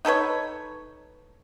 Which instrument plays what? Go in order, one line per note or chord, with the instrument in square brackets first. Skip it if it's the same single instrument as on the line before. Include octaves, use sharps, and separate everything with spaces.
[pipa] D#4 A4 B4 C#5